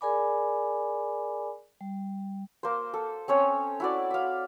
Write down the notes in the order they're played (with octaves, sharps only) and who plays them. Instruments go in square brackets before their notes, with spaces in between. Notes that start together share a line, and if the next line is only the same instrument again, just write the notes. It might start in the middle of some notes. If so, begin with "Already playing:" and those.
[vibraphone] G#4 A#4 D5 G#5 B5 D6
G3
[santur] A#3 C5
A4
C4 C#4 C#5
E4 F#4 D5
E5 F5